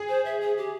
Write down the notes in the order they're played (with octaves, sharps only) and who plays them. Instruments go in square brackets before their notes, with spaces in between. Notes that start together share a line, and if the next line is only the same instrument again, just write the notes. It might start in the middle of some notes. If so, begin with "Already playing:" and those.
Already playing: [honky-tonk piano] G#4
[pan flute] C5
E5
G#4
G4